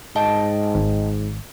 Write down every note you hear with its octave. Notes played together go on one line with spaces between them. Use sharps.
G#2 D#5 G5 A5
G#1